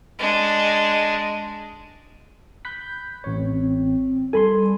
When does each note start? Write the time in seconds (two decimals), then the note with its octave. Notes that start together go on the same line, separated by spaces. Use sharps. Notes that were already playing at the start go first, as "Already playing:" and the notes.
0.19 G#3 D4
2.65 B5 F#6 G6 B6
3.24 A1 C4 C#5
4.33 G3 A4 G#5 B5 C6